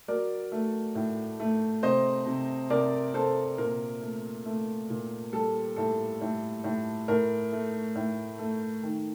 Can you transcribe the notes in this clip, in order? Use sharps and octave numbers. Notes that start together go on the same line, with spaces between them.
F#3 A#4 D5
A3
A2
A3
C3 C5 D#5
C3
C3 A#4 D5
C3 A4 C5
A#2 A#4
A3
A3
A#2
G3 A4
A2 A4
A2
A2
A2 A#4
A3
A2
A3
D#3